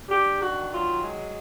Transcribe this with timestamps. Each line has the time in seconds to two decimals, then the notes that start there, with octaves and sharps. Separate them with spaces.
0.09 D4 G4
0.40 D#3 F#4
0.71 F#3 F4
1.03 G#3